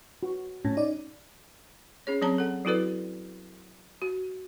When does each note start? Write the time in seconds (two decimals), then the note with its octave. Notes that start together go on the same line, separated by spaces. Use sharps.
0.23 F#4
0.65 A2 C#4
0.77 D#4 D5
2.07 C#4 G#4 C#5
2.21 F#3 C4 C#5 A5 A#5
2.38 A4 F#5
2.65 F#3 E4 F#4 A4 B4 D5
4.02 F#4